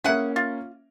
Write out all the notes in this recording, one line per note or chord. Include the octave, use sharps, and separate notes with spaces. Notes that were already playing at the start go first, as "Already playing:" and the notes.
A#3 C#4 E4 G#4 F#5
F4